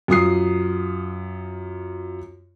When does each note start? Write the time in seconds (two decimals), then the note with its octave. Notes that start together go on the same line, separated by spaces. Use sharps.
0.08 F#2 F4 D#6 C7